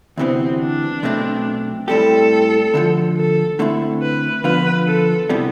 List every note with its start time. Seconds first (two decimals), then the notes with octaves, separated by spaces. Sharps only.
0.17 D2 C3 E3 B3 C4
0.60 D4
1.03 B1 B2 A3 C4
1.88 A2 G3 C4 G4 A4
2.74 D2 D3 F3
3.17 A4
3.59 D3 A3 C4 E4
4.02 B4
4.44 D3 F3 B3 F4 B4
4.87 A4
5.30 C3 E3 G3 B3